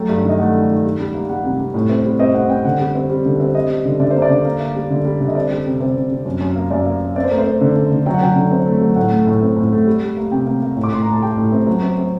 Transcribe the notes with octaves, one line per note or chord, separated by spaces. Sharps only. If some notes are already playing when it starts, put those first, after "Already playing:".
Already playing: F#3 A3 G5
G2
D#3
D#5
A3 F#5
D#3
D#3
G3
G3
A#3
G3 F#5
C3
C3
A2
C4
G3
C4 D#5
C4 F#5
C4 G5
D3 F#5
G3
C4
G3
D3
C4
G3 D#5
G3
D3
D3 D5
A#3 C5
D5
D3
A#3
A#3
G3
D3
G3
D3
D#5
C4 D5
G3
C3
C3 C5
C3
C3
F#2
F#2
A#3
F#2 D5
A#3
A#3
C4 D5
C5
A3 A#4
C5
C4
D3
D3
D3
F#3 G5
F#5
F#3 G5
D3
C4
A3
F#3
A2 F#5
A3
A2
C4
A2
A3
G3
G3
A#3
C3 G5
A#3
A#3
A2
D6
A2 C6
A2 A#5
A5
G3 G5
A2
C4
F#3
C4
C4